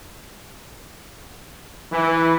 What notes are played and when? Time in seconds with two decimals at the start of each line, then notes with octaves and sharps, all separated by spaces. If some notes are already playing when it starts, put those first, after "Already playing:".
1.92 E3